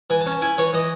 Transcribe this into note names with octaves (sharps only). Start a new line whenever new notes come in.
E3 G#5
A5
C#4
A5
E4 G#5
E3 C#5
E3 D#5